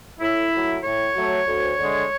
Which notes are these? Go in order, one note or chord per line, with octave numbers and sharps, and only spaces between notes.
A2 E4
F#3 A3
A2 C#5
F#3 A3
D2
D3 G#3